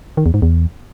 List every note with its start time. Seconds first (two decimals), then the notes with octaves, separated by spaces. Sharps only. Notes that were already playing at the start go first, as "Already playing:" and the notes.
0.17 D#3
0.26 E2
0.34 G#2
0.42 E2